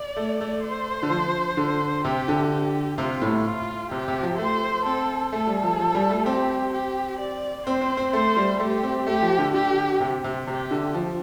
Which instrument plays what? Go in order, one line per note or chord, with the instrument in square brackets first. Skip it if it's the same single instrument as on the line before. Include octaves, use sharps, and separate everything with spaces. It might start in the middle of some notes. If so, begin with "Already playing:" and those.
Already playing: [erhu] D5
[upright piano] A3
A3
[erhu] C5
[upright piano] D3
F3
D3
[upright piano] C3 [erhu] G4
[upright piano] D3
[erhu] G4
[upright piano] C3 [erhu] F4
[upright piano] A2
[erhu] F4
[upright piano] C3 [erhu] G4
[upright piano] C3
F3
[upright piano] A3 [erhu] C5
[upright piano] C4 [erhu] A4
[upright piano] A3 [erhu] A4
[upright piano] G3
F3
F3
G3
A3
[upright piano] C4 [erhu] G4
[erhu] G4
D5
[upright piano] C4 [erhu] C5
[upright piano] C4
C4
[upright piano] A3 [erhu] C5
[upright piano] G3
[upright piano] A3 [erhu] G4
[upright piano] C4
[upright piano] A3 [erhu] G4
[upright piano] F3
D3
[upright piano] D3 [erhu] G4
[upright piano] C3
C3
[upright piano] C3 [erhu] G4
[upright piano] D3
F3